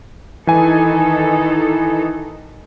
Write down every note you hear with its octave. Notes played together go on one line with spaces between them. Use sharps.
D#3 E3 D#4 A4 G#5